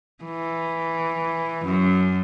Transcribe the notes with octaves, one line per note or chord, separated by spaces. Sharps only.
E3
F#2